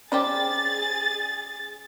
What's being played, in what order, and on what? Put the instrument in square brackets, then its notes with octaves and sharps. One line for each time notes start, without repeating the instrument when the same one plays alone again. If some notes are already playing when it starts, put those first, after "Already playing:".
[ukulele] C#4 D5 B5 [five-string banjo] G4 C5 A#5 [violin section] G#4 A6